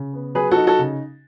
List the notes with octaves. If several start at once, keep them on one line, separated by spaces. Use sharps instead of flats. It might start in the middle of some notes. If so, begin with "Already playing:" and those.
Already playing: C#3
B3
F#3 G#4 B4
F#4 A4
D#4
F#4 A4
C#3